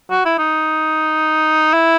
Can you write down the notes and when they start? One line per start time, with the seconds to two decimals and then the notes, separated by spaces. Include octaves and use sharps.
0.11 F#4
0.25 E4
0.38 D#4
1.74 E4